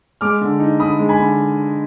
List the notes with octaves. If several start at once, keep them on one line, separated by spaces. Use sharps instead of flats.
G#3 D6 F6
D3
D#4
D3 B5 D#6
G#3
G#5 B5
D3